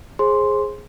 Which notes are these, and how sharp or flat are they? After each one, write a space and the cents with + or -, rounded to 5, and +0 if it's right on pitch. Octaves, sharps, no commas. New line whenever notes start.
G#4 +0 C5 +30 C6 +0